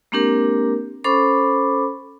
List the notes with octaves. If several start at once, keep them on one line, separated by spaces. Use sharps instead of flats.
G#3 A#3 C4 D4 G4 A#4
C#4 A4 C5 B5 D6